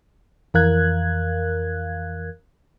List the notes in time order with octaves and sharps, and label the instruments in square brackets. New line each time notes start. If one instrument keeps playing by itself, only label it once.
[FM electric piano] F2 E3 A#4 F5 F#6 G#6